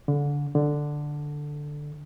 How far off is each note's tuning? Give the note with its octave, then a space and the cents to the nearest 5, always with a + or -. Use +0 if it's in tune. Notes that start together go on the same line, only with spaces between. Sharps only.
D3 -25
D3 +5